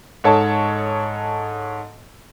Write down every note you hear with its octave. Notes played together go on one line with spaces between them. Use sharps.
G#2 A4 C#5 D#5 A5